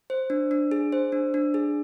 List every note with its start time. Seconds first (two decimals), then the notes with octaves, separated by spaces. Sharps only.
0.10 C5
0.30 D4
0.51 D4
0.71 G#4
0.92 C5
1.12 D4
1.34 D4
1.54 G#4